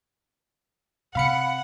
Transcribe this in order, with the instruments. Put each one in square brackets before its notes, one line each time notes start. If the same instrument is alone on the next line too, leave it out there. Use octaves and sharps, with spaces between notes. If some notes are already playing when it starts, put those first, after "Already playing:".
[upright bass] C3 [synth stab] F5 B5 C#7 [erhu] F#5